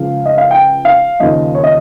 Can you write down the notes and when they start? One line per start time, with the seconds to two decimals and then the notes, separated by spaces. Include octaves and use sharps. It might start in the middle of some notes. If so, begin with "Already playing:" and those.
Already playing: C#2 C#3 F3 F5
0.26 D#5
0.38 F5
0.51 G5
0.85 F5
1.20 D#2 C#3 F3 D#5
1.55 C#5
1.64 D#5